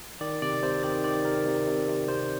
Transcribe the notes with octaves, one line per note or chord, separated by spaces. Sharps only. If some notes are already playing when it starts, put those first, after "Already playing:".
D#3 D5
C3 D5
C3 C5
D#3 D5
D#3 D5
C3 A#4
C3
C3
C3
C3 C5